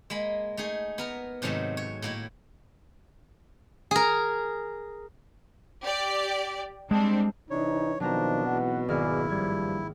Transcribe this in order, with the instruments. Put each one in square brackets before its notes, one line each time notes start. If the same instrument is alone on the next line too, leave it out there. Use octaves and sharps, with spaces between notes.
[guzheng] G#3 A#3 B5
A3 D#4 G#4
B3 A#4 A#5
G#2 C3 D#3 F#3 A3 A5
C#5
A2 A#3 E4
G#4 A#4
[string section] G4 D5
[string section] G3 C4 D4 [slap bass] G#3
[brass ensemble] C3 E3 D#4 [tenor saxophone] D4 [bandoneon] C#5
[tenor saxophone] B2 [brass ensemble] D#3 F3 [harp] F#3 C4 A#5 [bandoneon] D4
[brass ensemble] G#1 E3 F#5
[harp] G#1 A#3 F6 [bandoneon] E4 [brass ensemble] G#4 D5
[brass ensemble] G2 F3 [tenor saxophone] G3 [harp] G#6